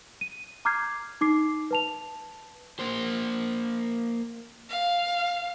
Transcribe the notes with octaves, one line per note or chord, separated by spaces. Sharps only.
D#7
A#5 D6 F6 G6 G#6 C7
D#4 D6 C7
B4 A5 F7
A#3 C5
F5